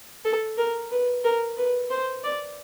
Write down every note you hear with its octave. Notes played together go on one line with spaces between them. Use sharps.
A4
A#4
B4
A#4
B4
C5
D5